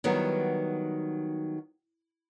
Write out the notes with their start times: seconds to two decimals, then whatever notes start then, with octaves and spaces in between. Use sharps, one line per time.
0.04 D#3 F#3 G3 B3